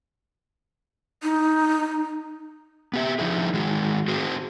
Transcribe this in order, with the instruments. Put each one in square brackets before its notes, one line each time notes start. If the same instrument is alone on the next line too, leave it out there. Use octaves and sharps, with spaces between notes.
[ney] D#4
[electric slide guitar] B3 G4 E5
F3 D#4 E4 G#4
D#3 G#3 F#4
C4 F#4 G#4 C5